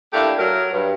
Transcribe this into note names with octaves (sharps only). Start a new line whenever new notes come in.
A3 A#3 D4 E4 G4
F#3 A#4
G2